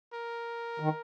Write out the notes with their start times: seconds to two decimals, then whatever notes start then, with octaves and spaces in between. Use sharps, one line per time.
0.13 A#4
0.80 D#3